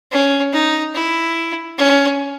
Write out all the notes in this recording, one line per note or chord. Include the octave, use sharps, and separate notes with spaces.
C#4
D#4
E4
C#4